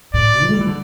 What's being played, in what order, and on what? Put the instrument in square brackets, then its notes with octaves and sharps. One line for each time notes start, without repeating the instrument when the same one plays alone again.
[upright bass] A2 [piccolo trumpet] D5
[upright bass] A3
G3
E3
D3